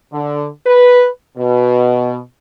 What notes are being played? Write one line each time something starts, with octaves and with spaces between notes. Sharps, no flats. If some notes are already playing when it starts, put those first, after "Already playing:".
D3
B4
B2